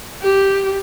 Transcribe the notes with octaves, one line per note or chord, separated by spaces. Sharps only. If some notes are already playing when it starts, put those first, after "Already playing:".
G4